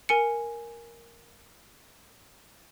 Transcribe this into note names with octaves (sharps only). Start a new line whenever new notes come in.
A#4 G#5 C#7